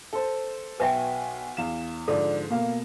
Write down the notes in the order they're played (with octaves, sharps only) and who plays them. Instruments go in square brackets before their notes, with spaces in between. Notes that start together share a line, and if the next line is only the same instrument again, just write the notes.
[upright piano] A4 C5
[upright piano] B1 G#5 [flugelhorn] F#4 [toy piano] B4 E5 G5
[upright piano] E2 F5 E7
[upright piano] G#2 D3 F3 [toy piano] A4 [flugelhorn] D5
[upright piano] B2 F5 [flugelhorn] A#3